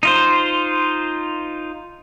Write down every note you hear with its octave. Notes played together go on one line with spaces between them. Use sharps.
D#4 F4 C5